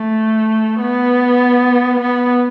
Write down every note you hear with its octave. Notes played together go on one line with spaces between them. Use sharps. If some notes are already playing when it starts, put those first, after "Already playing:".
Already playing: A3
B3
B3